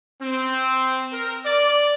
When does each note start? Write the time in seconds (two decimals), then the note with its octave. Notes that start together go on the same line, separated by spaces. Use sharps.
0.21 C4
1.12 A#4
1.45 D5